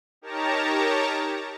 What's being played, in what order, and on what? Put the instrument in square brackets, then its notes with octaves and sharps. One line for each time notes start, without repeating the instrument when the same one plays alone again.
[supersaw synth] D#4 G4 A#4 C#5 A5 A#5